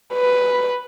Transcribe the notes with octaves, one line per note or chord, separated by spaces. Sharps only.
B4